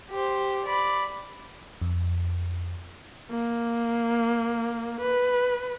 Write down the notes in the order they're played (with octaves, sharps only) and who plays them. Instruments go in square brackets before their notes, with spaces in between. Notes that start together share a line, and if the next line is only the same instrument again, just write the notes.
[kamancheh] G4 C5
D5 B5
[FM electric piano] F2
[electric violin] A#3
B4